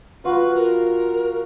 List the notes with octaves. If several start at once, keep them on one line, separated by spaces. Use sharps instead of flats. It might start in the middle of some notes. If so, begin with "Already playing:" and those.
F#3 F4 F#4 B4
A#4